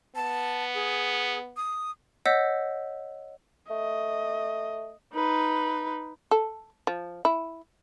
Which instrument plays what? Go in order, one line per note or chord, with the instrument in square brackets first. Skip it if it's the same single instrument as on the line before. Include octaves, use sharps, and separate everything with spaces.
[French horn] B3 [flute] A5
[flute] G#4
D#6
[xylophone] C#5 D#5 F#5 E6 G6 B6
[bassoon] A3 [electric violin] D#5
[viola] D#4 B4
[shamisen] A4
F3
E4